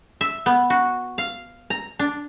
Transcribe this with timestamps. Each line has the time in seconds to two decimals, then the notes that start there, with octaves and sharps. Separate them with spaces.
0.21 E5
0.46 B3
0.70 F#4
1.18 F5
1.70 A#5
1.99 D4